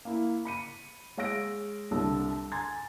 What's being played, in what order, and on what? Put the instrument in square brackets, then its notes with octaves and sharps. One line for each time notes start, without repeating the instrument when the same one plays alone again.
[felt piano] A#3 E4
B5 C#7 D#7
G#3 C#5 F5 E6 A#6 D7
C2 D3 A4 E6
G#5 A#5 C6 G#6 A6